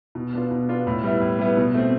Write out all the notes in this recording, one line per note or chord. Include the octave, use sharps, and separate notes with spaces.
B2
B3 D4 F4
B2
B3 D4 F4
A2
G3 B3 E4
A2
G3 B3 E4
B2
A3 C4